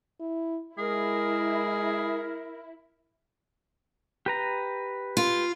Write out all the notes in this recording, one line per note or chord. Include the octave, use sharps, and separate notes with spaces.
E4
G#3 E4 G#4 A#4
G4 B4 A#5
F4